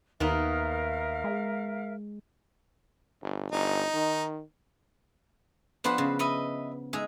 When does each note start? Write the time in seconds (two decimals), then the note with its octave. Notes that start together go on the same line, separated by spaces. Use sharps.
0.20 D#2 D#3 B3 D#4 A#4 E5 F5
1.24 G#3
3.22 G1
3.52 G1 D#4
3.94 D#3
5.84 F3 B3 D4 B4 C5 C6
5.98 C#3
6.19 B4 D#5 E5
6.93 G#3 D#4 G#4 E5